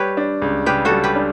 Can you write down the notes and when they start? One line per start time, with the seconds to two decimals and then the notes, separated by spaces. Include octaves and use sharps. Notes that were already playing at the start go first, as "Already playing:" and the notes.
Already playing: G3 G4 B4 C#5
0.17 D4
0.42 C#2
0.66 C#3 G4 B4
0.85 F#4 A4
0.91 G3
1.04 G4 B4
1.16 D4